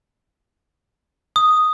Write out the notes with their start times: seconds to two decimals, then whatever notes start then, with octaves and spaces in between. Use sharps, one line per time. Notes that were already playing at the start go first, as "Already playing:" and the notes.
1.36 D#6